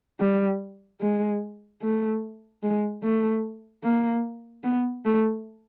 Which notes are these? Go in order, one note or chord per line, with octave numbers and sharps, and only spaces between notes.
G3
G#3
A3
G#3
A3
A#3
B3
A3